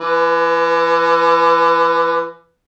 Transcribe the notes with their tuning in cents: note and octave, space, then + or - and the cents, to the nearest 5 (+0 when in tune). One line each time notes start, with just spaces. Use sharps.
E3 +40 B4 +5